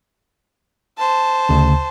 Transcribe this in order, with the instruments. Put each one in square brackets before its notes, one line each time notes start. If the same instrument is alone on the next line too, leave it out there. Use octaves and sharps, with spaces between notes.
[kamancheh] C5 A5
[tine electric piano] D2 C#3